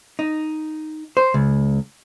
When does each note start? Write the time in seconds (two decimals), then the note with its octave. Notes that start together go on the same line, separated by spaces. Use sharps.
0.19 D#4
1.17 C5
1.34 C#2